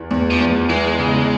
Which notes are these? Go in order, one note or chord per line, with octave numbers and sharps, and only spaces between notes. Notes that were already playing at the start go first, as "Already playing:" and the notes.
Already playing: E2 E3
E2
F3
E2
E3 G#3
C#3